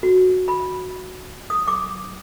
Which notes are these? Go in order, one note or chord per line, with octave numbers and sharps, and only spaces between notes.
F#4
B5
D#6
D6